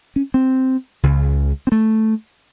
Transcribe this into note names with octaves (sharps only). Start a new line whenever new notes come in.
C#4
C4
C#2 C#3
C4
A3